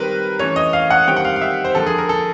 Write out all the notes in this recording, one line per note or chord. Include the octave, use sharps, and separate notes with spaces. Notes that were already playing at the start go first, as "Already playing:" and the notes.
Already playing: D#3 G3 C4 A#4 B4
E3 A3 C#4 C#5
D#5
F5
F#5
D#3 G3 C4 G5
F#5
F5
F5
E5
C5
D3 F3 A#3 A4
G#4
A#4
A4